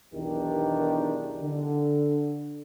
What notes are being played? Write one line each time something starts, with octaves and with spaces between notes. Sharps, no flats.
B1 E2 D#3 D4 G4 A#4
D3